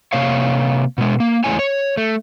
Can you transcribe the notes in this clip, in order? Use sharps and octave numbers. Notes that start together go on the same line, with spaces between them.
C3 A#3 C#5 F5
B2 G#3
A#3
E2 G#3 A3 E4 C#5 G#5
C#5
A3